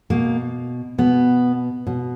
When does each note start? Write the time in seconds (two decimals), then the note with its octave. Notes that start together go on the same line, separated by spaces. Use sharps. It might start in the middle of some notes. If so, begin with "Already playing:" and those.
0.10 B2 A#3
0.98 B2 B3
1.87 B2